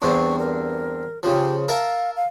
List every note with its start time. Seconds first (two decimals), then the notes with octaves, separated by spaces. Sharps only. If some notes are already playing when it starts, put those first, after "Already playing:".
0.02 E2 G2 C4 C#6
0.39 A#4
1.23 C#3 F3 G4
1.68 A#4 E5 F5 A5
2.16 F5